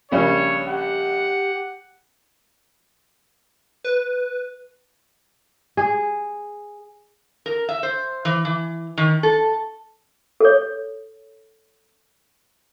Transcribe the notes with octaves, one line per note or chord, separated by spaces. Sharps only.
A#1 C#3 G3 C#5
G4 F#5
B4
G#4
A#4
E5
C5
E3
E3
D#3
A4
A4 C#5